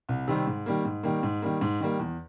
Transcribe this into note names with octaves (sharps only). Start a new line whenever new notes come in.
C2
C3 D#3 G3 C4
G#2
D#3 G3 A#3
G#2
D#3 G3 A#3
G#2
D#3 G3 A#3
G#2
D#3 G3 A#3
E2